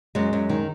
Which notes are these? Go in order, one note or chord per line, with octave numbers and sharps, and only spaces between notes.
F#2 G#3
F#2
D#3